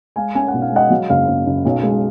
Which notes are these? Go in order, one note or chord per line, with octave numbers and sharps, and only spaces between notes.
G#3 F5 G#5
C#4 G#5
F#5
B1
F5
G#3 D#5 F#5
F#3 F5
F#1 F5
F#1
F#1
B1
G#3